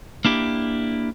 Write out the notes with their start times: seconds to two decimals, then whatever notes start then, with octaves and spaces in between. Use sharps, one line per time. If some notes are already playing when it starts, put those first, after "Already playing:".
0.25 A#3 D4 E4 G4